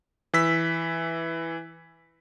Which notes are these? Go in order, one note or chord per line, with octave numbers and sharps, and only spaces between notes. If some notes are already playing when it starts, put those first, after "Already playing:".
E3 E6 B6